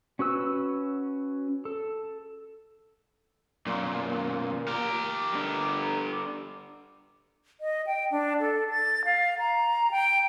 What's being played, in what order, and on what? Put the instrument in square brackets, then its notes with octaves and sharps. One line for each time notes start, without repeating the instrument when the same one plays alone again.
[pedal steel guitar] C#4 F#4 B4 E6
A4
[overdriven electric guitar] B1 F#2 [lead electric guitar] A#2
[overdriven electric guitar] G4 A#4
[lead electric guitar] G2 D3
[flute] D#5
G5
D4
A4
A6
F5
A#5
G5